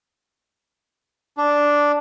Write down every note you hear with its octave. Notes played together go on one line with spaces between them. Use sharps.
D4